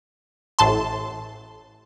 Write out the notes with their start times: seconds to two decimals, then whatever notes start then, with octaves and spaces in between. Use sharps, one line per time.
0.59 A1 A2 A5 C6